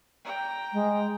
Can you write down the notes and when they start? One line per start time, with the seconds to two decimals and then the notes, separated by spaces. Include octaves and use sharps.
0.25 G5 A#5
0.73 G#3